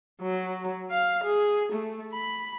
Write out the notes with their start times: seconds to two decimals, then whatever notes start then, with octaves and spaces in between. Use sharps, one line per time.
0.22 F#3
0.91 F5
1.24 G#4
1.72 A3
2.13 B5